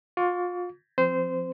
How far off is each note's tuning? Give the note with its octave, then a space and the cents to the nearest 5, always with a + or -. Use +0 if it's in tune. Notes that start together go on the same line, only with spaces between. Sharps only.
F4 +30 C#6 +45
F3 +0 C4 +0 C5 -20